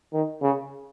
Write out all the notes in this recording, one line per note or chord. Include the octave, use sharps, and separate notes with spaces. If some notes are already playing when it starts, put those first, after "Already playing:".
D#3
C#3